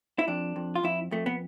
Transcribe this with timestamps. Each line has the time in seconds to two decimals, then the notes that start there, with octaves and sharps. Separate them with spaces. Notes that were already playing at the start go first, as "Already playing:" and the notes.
0.19 E4
0.28 F2 D4
0.56 F2
0.75 F4
0.83 F2 E4
1.11 F2 A3
1.26 B3